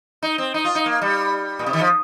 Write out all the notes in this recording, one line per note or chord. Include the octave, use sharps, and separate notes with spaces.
D#4
C4
D#4
F4
D#4
A#3
G3
A#2
C3
D#3
F3